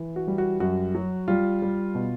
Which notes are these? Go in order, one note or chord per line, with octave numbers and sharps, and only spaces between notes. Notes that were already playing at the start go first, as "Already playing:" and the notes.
Already playing: E3
F#4
G3
F#4
F#2 F#4
F#3
G3 F4
G3
B2